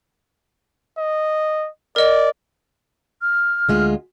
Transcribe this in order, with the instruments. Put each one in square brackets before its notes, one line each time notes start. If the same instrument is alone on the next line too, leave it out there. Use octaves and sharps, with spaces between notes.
[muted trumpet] D#5
[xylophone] A#4 D#5 [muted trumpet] D5
[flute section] F6
[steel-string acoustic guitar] D2 G#3 F4